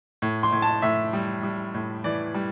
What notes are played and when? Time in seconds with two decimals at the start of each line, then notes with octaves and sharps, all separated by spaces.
0.22 A2
0.43 C6
0.52 A2
0.62 A5
0.82 A2 E5
1.13 G3
1.43 G3
1.74 A2
2.04 E3 D5
2.34 G3